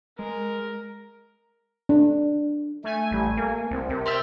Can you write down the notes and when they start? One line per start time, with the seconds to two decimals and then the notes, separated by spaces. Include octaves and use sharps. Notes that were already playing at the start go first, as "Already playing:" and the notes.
0.19 G#3 A#4
1.89 D4
2.84 A3 E5 G#5
3.11 A1 G3
3.37 A#3 A#4
3.71 C2 C4
3.90 C3 A#4
4.06 C5 D5 E5 G5 F6